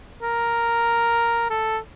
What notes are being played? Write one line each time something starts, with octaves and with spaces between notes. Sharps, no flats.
A#4
A4